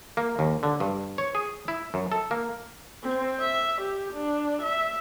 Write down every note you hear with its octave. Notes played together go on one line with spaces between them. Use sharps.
A#3
D#2
D3
G2
C#5
G#4
E4
F#2
A4
A#3
C4
E5
G4
D4
E5